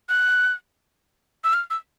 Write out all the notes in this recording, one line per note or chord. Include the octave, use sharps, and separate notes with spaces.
F#6
E6
F6
E6